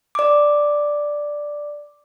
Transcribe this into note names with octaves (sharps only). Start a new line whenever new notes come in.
D5 D6